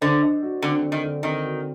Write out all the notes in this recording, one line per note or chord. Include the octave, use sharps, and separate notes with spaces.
D3 C5
D#5
F#4
D3 C4
D3
D#3
D3
D#3 C4
F#4